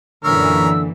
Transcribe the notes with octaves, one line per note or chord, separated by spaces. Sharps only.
F#2 A#2 D3 E3 A#4 C#5 E6